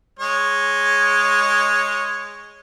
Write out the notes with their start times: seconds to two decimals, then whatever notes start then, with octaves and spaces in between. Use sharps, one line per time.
0.19 G#3 C#5